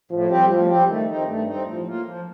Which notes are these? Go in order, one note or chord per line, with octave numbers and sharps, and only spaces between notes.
A2 F3
G3 C4 G4
A2 F3
G3 C4 G4
D#3 A3
C4 D#4
G2 A3
C4 D#4
A2 F3
A#3 F4
F3